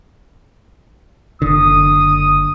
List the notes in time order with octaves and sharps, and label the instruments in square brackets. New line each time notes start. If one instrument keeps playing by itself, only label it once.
[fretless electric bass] F#1 D3 [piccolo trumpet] D#6